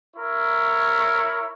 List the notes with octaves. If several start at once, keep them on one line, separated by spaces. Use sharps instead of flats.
E4 A#4 C#5